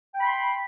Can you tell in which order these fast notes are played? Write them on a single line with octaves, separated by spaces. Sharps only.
G5 B5 C6